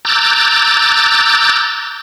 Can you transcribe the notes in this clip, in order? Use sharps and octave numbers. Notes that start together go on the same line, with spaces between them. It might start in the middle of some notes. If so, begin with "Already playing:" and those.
A#5 D6 E6 F#6 G6 A6